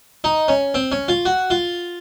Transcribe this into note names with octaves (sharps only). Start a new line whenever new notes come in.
D#4
C#4
C4
C#4
F4
F#4
F4